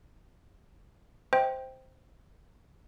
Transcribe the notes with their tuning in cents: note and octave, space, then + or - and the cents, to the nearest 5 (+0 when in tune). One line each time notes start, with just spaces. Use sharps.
C5 +0 D#5 +40 G5 +0